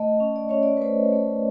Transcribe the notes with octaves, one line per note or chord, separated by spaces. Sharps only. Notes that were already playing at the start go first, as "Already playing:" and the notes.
Already playing: A3 D#5
C#4
D5
C#4 C#5
D5
B4
A3 C5
A3